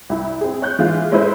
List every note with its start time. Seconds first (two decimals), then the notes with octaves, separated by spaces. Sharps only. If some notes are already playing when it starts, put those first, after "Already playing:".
0.09 C2 E4
0.41 C4 G#4
0.62 C#5 F#6 G6
0.79 E3 G#3 F4 G#4 F5
1.12 G#3 C#4 E4 A4 B4 C5